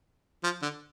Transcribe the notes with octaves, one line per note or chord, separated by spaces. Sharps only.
F3
D3